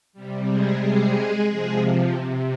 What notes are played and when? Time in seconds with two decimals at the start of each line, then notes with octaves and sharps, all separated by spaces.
0.13 C3 G3
0.47 G#3 G#4
0.80 G#3 G#4
1.48 C3 F3 G#3 G#4